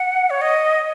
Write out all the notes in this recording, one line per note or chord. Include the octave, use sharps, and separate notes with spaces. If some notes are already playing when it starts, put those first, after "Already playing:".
Already playing: F#5
C#5
D#5